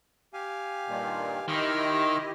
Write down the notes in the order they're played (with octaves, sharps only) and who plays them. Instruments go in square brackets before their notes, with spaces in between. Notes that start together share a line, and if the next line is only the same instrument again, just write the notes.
[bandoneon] G4 F5 G#5
[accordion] G2 A#2 D#3
[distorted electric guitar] D#3 [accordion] E4 G4 D#5 [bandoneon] E5 C6 F6